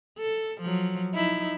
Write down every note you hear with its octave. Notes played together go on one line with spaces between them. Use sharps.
A4
F3 F#3
F3 D#4 E4